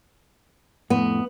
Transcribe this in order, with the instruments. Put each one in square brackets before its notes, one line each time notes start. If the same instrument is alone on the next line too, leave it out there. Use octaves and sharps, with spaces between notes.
[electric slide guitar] F2 A2 [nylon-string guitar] B3